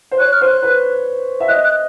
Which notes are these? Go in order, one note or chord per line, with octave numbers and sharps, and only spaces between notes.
C5
C#5 F#6
F6
C5
F#6
B4
E5
D#5 F#6
F#6